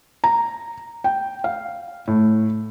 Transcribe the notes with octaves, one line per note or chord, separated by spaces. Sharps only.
A#5
G5
F5
A2